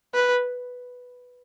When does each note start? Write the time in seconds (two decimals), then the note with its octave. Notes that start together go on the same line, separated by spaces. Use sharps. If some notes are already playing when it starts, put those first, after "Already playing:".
0.14 B4